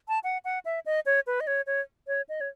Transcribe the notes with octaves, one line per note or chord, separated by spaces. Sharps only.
A5
F#5
F#5
E5
D#5
C#5
B4
D#5
C#5
C#5
C#5
D#5
C#5